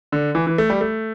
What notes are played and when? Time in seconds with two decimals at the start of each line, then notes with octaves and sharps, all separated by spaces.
0.12 D3
0.35 E3
0.47 E3
0.58 A3
0.70 G3
0.81 A3